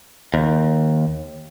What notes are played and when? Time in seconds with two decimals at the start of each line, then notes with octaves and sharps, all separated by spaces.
0.34 D#2